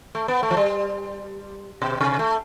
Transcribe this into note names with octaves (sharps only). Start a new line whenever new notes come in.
A3
B3
A3
F3
G3
B2
C3
A3